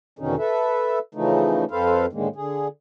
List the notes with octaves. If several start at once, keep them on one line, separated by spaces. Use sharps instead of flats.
E2 B2 D3 D#3 C#4 D#4
A4 B4 E5
C#3 E3 F3 A3 D#4
F2 C4 A4 B4 C5 F5
A2 D3 D#3 G#3 A#3
D3 G#4